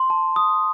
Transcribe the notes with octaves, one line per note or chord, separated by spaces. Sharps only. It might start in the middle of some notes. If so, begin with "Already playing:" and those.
Already playing: C6
A5
D#6